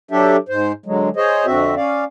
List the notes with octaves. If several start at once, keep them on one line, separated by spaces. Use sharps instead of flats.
F#3 D4 G4 A4 E5
G#2 C5
D3 F#3 G#3
G#4 C5 C#5 D#5
F2 D3 C4 F#4 E5
C#4 D5 F5